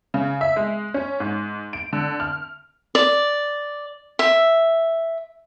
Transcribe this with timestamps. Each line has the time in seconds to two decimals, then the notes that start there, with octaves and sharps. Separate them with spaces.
0.14 C#3
0.41 E5
0.56 G#3
0.94 C#4
1.20 G#2
1.73 D7
1.93 D3
2.20 F6
2.95 D5
4.19 E5